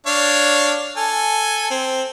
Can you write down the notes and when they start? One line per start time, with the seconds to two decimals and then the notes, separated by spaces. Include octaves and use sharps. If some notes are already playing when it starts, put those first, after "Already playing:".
0.06 D4 C#5 F5
0.97 A4 G#5
1.71 C4